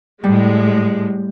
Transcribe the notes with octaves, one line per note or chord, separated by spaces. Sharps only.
A2 G3 G#3